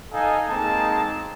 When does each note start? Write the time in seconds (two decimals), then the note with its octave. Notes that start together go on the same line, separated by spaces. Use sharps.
0.13 D#4 A4 D#5 F5 G#5
0.50 G#3 A#3 C4 D#4 A5